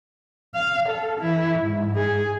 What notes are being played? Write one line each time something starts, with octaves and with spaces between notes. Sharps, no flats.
F5
A4
E3 E4
G#2
G#4